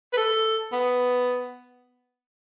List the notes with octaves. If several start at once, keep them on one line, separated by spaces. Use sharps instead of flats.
B4
A4
B3